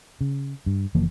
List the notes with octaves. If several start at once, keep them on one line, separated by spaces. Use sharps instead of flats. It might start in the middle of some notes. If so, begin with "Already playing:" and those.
C#3
G2
F#1 E3 F3 A#3